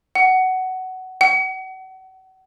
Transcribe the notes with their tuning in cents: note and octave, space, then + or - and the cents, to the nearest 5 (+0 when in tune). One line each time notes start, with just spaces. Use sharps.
F#5 +15
F#5 +35